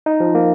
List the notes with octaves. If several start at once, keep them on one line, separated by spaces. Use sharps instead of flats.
D#4
F3
A#3